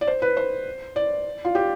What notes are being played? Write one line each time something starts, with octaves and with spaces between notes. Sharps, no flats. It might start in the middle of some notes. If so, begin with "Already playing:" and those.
D5
C5
B4
C5
D5
F4
G4